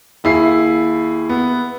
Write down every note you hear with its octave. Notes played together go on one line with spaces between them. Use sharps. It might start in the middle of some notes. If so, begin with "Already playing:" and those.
D#2 E4 G#4 C7
B3